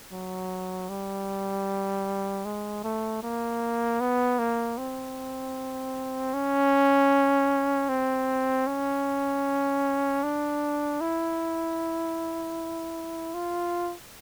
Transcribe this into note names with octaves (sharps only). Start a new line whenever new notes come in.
F#3
G3
G#3
A3
A#3
B3
A#3
C4
C#4
C4
C#4
D4
E4
F4